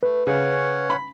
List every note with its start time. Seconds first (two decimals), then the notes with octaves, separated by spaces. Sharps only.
0.03 A3 B4
0.27 C#3 C#4 C#5 F#5
0.90 B5